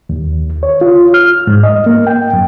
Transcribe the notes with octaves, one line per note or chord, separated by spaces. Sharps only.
D#2
C#5
F4
F6
G#2
D#5
A#3
G5
F#2